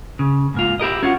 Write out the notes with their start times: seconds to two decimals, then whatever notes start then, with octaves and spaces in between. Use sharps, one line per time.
0.19 C#3
0.54 G#2 A#3 F4
0.80 E4 G4 A#4 D#5
1.03 C#4 F4 F#4